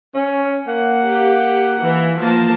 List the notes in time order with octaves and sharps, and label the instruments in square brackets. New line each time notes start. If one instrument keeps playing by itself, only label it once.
[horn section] C#4
A#3 F#5
[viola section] G4
E3
F3 A#3 A5